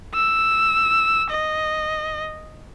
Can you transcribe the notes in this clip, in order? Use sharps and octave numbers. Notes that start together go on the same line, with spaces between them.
E6
D#5